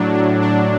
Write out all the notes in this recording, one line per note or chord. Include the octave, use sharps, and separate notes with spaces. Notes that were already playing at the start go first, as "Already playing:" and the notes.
Already playing: A2 F#3 D4
D4
D4